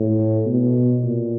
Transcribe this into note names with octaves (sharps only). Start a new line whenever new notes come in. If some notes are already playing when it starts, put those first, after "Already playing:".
Already playing: A2
B2
A#2